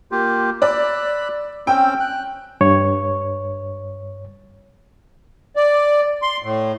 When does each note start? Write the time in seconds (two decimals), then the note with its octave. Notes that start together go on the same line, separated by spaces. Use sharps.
0.12 A#3 F4 G4
0.62 D5 B5 E6 F#6
1.67 C4 C#4 G5 E6
2.00 F#6
2.61 G2 C#5
5.56 D5
6.22 C6
6.42 A2